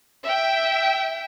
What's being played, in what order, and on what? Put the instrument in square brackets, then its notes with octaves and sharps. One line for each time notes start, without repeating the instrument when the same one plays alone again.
[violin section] E5 G5